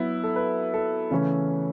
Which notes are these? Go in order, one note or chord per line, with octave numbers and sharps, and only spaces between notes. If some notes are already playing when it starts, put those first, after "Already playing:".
Already playing: F#3 B3 E4
A4
B4
A4
C#3 E3 A3 C#4